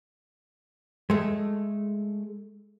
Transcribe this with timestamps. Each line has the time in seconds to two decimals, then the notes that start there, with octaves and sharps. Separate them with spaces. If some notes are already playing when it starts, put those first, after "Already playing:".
1.10 G#3 A3